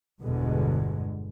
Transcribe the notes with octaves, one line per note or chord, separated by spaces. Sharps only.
G1 E2 G2 B2 D3 G#3